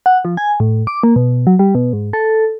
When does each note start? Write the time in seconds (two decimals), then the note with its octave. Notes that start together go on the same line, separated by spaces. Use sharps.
0.06 F#5
0.25 F3
0.37 G#5
0.60 A2
0.87 D6
1.03 A#3
1.16 B2
1.47 F#3
1.59 G3
1.75 B2
1.93 G#2
2.13 A4